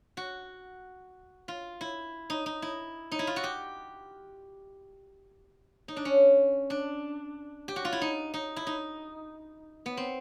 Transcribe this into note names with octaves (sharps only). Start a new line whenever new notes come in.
F#4
F4
E4
D#4
D#4
E4
D#4
E4
F4
F#4
G4
D#4
D4
C#4
D4
G4
F#4
F4
E4
D#4
D#4
E4
D#4
B3
C4